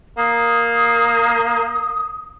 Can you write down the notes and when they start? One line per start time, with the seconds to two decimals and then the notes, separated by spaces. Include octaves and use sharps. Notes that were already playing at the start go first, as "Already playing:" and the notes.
0.18 A#3 D#6